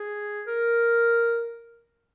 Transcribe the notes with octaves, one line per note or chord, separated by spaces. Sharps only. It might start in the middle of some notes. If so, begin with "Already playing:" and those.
Already playing: G#4
A#4